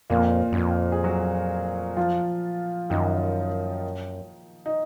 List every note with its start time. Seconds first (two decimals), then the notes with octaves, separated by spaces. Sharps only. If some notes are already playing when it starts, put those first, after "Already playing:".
0.10 F2 A#2 A#3
0.53 F#2
0.57 F2
0.92 G#4
1.04 F#3 F#4
1.97 F3 F4
2.90 F#2 D#3 D#4
4.66 D#4